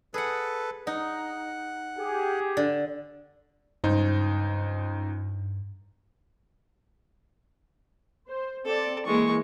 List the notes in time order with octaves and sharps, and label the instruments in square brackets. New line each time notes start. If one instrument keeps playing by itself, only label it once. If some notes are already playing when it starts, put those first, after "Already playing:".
[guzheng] G#4 F#5 [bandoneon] A4 B4
[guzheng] D#4 [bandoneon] F#5
[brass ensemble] G4 G#4
[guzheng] D3
[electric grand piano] C#2 D#4 C5 [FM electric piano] G2
[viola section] C5
[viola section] C4 D5 [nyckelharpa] A4 A5
[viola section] E3 A#3 [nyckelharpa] G#3 C#6